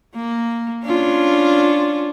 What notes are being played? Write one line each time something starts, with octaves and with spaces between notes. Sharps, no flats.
A#3
C#4 D4 F4